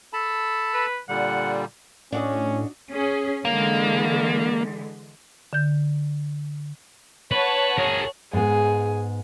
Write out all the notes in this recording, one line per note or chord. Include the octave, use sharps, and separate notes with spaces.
A4 A5 B5
B4
A#2 D3 G3 F#5
A2 C#4 D4 F#4 D#5
C#4 G#4
D3 E3 G#3 A#3
D3 G6
B4 C#5 F#5 A5
G#4 A#4
G#2 B3 G#4